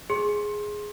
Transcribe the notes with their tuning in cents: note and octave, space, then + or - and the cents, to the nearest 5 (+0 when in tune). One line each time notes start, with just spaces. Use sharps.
G#4 +0 C6 +20